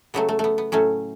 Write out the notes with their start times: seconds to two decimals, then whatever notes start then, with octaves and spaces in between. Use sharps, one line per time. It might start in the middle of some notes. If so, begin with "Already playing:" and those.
0.14 C#3 F#3 A3 B3
0.29 A3
0.39 A3 B3
0.58 B3
0.72 A2 F#3 A3 C#4